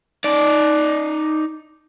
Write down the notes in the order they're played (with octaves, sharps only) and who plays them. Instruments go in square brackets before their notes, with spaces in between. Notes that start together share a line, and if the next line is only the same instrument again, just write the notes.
[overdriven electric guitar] D#4 D5